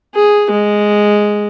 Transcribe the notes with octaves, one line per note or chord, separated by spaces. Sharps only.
G#4
G#3